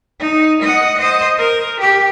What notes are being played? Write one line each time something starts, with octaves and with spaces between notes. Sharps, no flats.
D#4
D#5 F#5
C5 D#5
A#4
G4